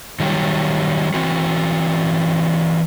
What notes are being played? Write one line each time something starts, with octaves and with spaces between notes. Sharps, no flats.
D#3 F#3 G3
E3 C4 F#4